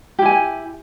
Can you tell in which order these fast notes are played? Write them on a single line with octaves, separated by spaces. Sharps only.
G4 E4 G#5